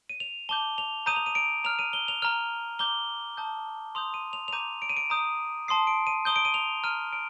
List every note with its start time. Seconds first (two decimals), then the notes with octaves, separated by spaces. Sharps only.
0.10 D#7
0.20 F7
0.49 A5 D6 G6 G7
0.78 F7
1.06 A#5 D#6 G6 D#7
1.16 F7
1.26 D#7
1.35 D7
1.64 A#5 F6 F7
1.79 D#7
1.93 G7
2.08 F7
2.22 A#5 F6 F7
2.79 A#5 D6 G6 G7
3.37 A5 D#6 G6
3.95 C6 D#6 G6 F7
4.14 D#7
4.33 F7
4.48 F7
4.53 A#5 D6 G6 D#7
4.82 D7
4.89 D#7
4.97 D7
5.10 A#5 D#6 G6
5.68 A5 C6 D#6 C7
5.87 D7
6.07 D#7
6.25 A#5 D#6 G6 G7
6.36 D7
6.45 D#7
6.54 F7
6.84 A#5 F6 D#7
7.13 D7